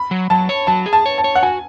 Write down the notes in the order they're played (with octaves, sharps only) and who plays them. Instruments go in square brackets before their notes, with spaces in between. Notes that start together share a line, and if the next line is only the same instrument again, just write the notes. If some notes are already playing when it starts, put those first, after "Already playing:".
Already playing: [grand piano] B5
[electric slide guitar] F#3
[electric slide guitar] F#3 [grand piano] A5
[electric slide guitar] C#5
[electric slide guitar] F#3 [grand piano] A5
[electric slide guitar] G#4
[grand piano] A5
[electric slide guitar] C#5
[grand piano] A5
[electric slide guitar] C#5
[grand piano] F#5
[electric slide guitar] F#4 [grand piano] G#5